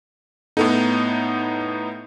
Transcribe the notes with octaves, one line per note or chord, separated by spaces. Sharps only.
A2 B3 D#4 A4